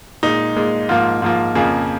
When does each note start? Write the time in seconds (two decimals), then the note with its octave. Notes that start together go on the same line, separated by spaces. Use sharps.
0.23 A#2 G#3 D#4
0.56 A#2 G#3
0.89 G#2 F3 A#3 F4
1.22 G#2 F3 A#3
1.55 F2 C#3 F3 A#3 G#4